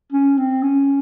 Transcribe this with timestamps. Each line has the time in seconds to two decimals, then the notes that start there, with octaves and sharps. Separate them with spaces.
0.12 C#4
0.38 C4
0.63 C#4